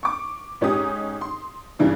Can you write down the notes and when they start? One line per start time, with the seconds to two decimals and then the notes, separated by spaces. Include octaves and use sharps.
0.03 C#6 D6
0.61 G#2 C#4 D#4 G4 D#6
1.21 C6
1.79 G2 C#3 E3 D4